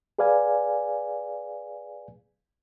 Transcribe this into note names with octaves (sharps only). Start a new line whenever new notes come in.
G#4 B4 D5 F5 G#5